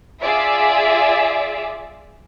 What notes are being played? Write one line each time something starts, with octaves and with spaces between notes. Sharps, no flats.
F4 G#4 D5 E5